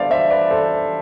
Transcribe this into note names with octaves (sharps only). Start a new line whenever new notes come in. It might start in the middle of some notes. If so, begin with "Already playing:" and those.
Already playing: D3 G3 B3 A4 C5 D5 E5 F5
C5 E5
B4 D5
A4 C5